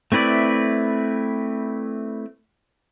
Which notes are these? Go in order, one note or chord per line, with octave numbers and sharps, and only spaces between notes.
A3 C4 E4 B4 D5